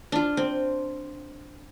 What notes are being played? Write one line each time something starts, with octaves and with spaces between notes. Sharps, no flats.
D4 F4
C4